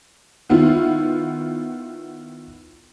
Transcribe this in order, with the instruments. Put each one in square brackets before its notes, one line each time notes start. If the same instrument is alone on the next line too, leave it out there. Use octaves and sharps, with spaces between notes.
[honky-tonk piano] D#3 B3 E4 F4